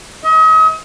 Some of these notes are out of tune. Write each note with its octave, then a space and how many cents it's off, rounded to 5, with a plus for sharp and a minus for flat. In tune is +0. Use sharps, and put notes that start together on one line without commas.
D#5 +40